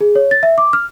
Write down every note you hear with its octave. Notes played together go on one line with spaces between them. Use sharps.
G#4
C#5
A6
E5
D6
F6